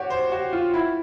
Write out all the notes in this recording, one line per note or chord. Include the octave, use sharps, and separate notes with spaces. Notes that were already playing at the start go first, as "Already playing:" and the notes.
Already playing: F#4 G4 C#5
C5
F#4
F4
E4